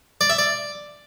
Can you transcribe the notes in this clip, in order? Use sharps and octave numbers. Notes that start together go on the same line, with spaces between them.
D5
E5
D5